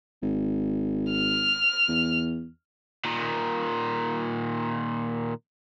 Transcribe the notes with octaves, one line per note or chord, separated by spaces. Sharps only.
G#1
F6
E2
A#2 D#3